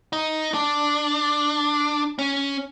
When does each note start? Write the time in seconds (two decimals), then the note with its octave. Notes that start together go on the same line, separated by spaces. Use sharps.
0.13 D#4
0.54 D4
2.19 C#4